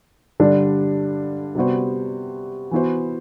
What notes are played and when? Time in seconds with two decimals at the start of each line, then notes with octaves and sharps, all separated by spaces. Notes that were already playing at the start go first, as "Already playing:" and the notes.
0.40 G2 D3 G3 D4
1.55 C3 G3 B3 F#4 C5
2.71 E3 B3 F#4 C5